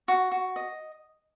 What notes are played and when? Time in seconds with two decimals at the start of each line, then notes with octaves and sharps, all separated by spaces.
0.08 F#4
0.31 F#4
0.56 D#5